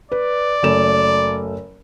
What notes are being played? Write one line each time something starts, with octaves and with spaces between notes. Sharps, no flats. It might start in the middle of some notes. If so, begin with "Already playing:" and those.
B4 D5
F#1 A3 E7